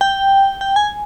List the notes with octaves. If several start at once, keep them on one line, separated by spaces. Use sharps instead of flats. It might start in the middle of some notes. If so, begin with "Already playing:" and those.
G5
G5
G#5